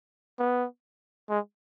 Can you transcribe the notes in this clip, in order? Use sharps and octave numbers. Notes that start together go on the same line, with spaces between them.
B3
G#3